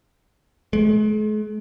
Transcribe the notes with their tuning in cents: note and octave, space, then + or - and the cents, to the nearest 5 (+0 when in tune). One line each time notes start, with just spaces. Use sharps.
G#3 +45